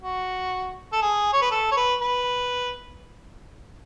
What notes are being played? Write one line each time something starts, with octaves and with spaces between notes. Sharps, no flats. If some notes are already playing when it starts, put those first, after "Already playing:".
F#4
A4
G#4
C#5
B4
A4
C#5
B4
B4